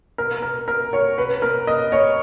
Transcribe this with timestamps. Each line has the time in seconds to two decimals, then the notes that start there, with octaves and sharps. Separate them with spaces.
0.18 A#4
0.42 A#4
0.68 A#4
0.93 C#5
1.18 B4
1.42 A#4
1.67 D#5
1.92 C#5